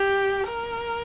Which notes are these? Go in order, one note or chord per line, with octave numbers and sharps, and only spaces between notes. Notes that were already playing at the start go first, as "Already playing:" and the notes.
Already playing: G4
A#4